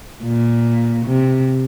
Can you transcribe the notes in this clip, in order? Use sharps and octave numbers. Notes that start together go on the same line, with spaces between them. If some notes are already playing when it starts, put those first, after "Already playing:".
A#2
C3